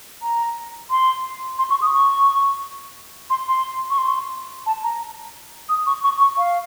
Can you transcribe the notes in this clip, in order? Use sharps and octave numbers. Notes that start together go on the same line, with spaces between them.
A#5
C6
C6
C#6
D#6
C#6
C6
C6
C#6
C6
A5
A#5
D#6
C#6
C#6
C#6
F5